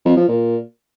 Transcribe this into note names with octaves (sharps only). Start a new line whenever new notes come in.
F2
F3
A#2